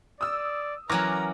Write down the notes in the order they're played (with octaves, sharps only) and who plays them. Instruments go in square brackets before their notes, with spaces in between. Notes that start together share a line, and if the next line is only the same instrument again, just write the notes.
[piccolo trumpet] D5 [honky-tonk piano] D#6 E6
[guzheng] E3 F#3 C#4 [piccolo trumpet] A#4 [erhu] A#5 [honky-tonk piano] D6 F6 A#6